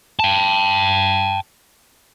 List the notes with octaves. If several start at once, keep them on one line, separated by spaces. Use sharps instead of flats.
G5 A5